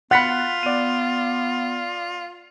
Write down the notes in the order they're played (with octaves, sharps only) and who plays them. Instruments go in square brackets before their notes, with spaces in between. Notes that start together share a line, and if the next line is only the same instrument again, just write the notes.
[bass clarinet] B3 [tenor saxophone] F4 [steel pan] F#5 B5 [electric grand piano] F#6 A6 B6
[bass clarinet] B3 [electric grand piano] D5 D#7